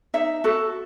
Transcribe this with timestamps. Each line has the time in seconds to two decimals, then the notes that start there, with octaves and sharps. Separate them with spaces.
0.14 D#4 E5
0.44 F#4 A4